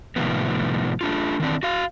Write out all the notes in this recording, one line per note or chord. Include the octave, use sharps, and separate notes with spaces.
A2 C3 D#3 F3 B3
A3 D4 F4
D#3 E3 C4 D4
F#4 F5